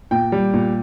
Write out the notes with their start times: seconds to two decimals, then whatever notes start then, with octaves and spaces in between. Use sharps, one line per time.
0.11 A#2 G5
0.32 G3
0.54 A#2